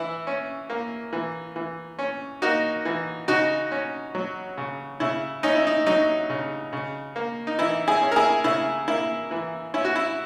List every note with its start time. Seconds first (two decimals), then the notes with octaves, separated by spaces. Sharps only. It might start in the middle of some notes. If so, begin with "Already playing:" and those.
Already playing: E3 E4
0.27 C#4
0.70 A#3
1.13 E3
1.56 E3
1.99 C#4
2.42 A#3 D#4 F#4
2.85 E3
3.28 C#3 D#4 F#4
3.71 C#4
4.15 F#3
4.58 C#3
5.00 C#3 E4
5.43 C#4 D#4
5.55 E4
5.67 D#4
5.86 F#3 D#4
6.30 C#3
6.73 C#3
7.16 A#3
7.47 D#4
7.59 E3 E4
7.88 E4 G#4
8.02 C#4
8.12 A#4
8.16 E4 G#4
8.44 C#3 E4
8.88 A#3 E4
9.31 E3
9.74 C#4 E4
9.85 F#4
9.96 E4